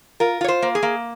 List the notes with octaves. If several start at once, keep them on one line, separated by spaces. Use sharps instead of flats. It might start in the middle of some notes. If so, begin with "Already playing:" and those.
F4 A#4
F4 C#5
C5
A#3
G#4
A#3